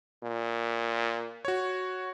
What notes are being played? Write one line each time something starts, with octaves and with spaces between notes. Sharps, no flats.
A#2
F#4 C#5